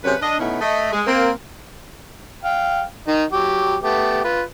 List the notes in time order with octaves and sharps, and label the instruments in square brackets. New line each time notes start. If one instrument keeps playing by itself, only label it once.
[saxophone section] F#2 C3 G#4 B4 C#5
D4 D#5
B2 A3 B3 C#4 D#4 E4
A3 D#5
G#3
A#3 C4
[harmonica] F5 G5
D#3 D#4
F#3 G4
A3 B3 G4
F4 B4